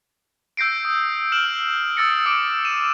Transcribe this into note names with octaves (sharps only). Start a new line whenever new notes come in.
E6 G6 A#6 C7 D7
D#6
F6 D7 E7 F#7
D#6 E6 A6 A#6 C#7
D6 E6 D7
D#7 E7